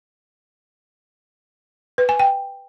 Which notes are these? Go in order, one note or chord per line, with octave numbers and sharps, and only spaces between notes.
B4
G#5
G5